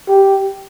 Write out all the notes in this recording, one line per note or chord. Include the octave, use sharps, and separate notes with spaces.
G4